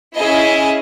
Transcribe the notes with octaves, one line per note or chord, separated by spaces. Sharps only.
C#4 E4 G#4 D#5